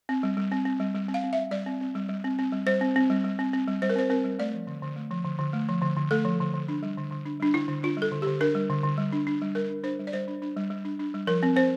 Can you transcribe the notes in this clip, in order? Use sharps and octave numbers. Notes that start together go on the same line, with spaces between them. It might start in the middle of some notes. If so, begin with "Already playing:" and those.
C4
G3
G3
C4
C4
G3
G3
C4
F5
C4
E5
G3
G3 D5
C4
C4
G3
G3
C4
C4
G3
G3 C5
C4
C4
G3
G3
C4
C4
G3
G3 C5
A#4
C4 C5
C4 A#4
G3
A3 D5
F3
D3
D3
A3
F3
D3
D3
A3
F3
D3
D3
A3 A4
F3
D3
D3
D4
G3
D3
D3
D4
G3 D4
D3 E4
D3
D4 F4
G3 A4
D3
D3 G4
D4 A#4
G3
D3
D3
G3
D4
D4
G3
G3 A#4
D4
D4 C5
G3
D5
G3 C5
D4
D4
G3
G3
D4
D4
G3
F3 A#4
C4
C4 C5